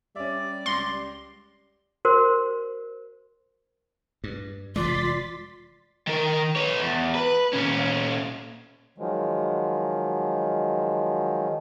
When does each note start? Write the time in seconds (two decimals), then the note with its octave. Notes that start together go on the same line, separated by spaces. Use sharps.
0.16 G3 C#4 D5 E5
0.66 C#2 C6 D6 A#6
2.05 F#4 A#4 C5
4.24 G2
4.76 F1 E3 G#3 F4 D5 C6 A6 B6
6.07 D#3 A#4
6.56 B4 C#5
6.80 E2
7.15 B4
7.54 A#2 C#4
8.98 D#3 F3 F#3 G#3